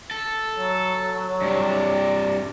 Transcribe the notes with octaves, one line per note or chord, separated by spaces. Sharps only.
A4
F#3
G2 C3 D5